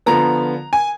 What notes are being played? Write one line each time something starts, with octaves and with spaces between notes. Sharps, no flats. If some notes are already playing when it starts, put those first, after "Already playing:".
D3 F3 B3 A#5
G#5